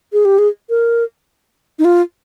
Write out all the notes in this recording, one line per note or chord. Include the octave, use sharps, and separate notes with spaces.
G#4
G4
G#4
A#4
D#4
F4